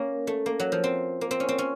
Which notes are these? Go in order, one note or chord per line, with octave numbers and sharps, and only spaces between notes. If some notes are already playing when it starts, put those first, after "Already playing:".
Already playing: A#3 C#4
A3
A#3
F#3
F3
C4
A#3
C4
C#4
C4
C#4